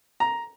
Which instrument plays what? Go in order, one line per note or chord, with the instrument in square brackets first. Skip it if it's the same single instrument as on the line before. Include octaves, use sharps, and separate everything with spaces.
[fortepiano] A#5